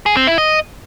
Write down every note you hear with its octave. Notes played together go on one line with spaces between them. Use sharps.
G#4
C4
E4
D#5